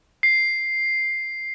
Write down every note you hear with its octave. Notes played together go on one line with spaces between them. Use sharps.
C7